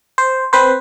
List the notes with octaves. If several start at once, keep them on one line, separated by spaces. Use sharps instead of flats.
C5
C4 B4 C5